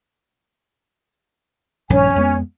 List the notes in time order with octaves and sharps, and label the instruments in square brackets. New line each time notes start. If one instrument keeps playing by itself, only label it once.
[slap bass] A#1 G2 D#3 [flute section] C#4 C#5 G#5
[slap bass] F2 G#3 B3